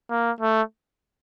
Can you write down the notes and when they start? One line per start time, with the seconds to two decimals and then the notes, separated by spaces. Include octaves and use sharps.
0.10 A#3
0.41 A3